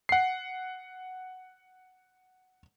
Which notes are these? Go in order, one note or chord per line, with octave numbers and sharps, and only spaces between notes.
F#5 C7